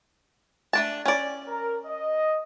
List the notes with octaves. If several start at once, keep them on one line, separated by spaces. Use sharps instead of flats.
A3 D4 A5
C#4 D5
A#4
D#5